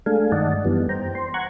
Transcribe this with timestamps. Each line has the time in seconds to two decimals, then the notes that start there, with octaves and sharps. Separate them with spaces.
0.06 G#3 A3 D4 A4 F5 G#5
0.32 G2 D#3 D5 D#5 F#5 A5
0.65 F#2 E3 G3 B3
0.89 C5 G5 A#5
1.15 C5 C6
1.34 F#5 A#5 C#6 F#6 G#6